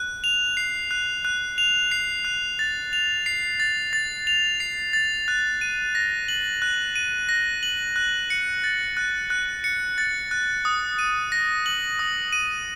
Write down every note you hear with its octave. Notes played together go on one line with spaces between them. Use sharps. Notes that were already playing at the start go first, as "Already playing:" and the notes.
Already playing: F#6
F7
C7
F#6
F#6
F7
C7
F#6
A6
F7
C7
A6
A6
F7
C7
A6
F#6
D#7
A#6
F#7
F#6
D#7
A#6
F#7
F#6
C#7
A6
F#6
F#6
C#7
A6
F#6
D#6
D#7
A#6
F#7
D#6
D#7